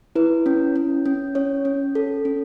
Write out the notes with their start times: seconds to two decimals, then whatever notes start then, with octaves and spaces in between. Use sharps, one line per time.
0.15 E4 B4
0.46 C#4
0.76 C#4
1.06 C#4
1.35 C#4 C#5
1.65 C#4
1.95 A4
2.25 C#4